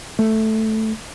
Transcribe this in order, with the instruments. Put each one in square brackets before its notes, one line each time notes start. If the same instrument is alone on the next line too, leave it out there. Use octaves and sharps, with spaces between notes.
[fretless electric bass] A3